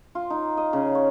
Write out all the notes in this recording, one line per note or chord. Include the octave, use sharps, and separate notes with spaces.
F4
D#4
D#5
C#3
C#5